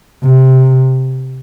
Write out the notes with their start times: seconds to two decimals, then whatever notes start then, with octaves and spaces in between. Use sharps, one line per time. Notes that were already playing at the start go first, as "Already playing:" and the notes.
0.23 C3